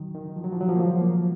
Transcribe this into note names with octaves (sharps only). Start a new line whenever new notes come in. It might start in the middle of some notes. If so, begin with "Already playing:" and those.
Already playing: D#3 F#3
D#3
F3
F#3
F3
F#3
F3
A#3
F3 G#3
F#3 A#3